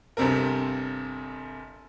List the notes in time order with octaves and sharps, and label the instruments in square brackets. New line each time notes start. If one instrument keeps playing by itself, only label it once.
[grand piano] G1 G2 C3 C4 A#4